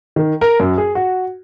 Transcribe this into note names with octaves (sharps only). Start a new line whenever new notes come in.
D#3
A#4
F#2
G#4
F#4